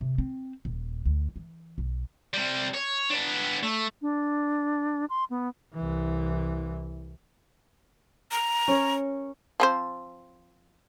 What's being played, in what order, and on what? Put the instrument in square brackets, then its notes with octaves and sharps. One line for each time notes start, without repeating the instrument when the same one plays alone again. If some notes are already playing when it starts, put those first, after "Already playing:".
[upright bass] C3
C4
D#1
D2
E3
B1
[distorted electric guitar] C3 G3
C#5
B3 D4
A3
[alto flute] D4
C6
B3
[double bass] C2 E3
[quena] A#5
[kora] C#4 A#4 C#5
[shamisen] F3 C4 C5